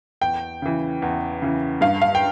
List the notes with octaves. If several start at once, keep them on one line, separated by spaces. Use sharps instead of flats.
E2 G5
C#3 E3
E2
C#3 E3
G2 F5
F5
G5